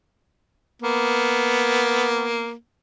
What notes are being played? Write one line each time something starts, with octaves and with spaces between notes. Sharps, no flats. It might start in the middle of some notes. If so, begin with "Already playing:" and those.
A#3 B3